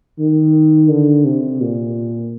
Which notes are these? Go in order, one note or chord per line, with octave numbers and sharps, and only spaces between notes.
D#3
D3
C3
A#2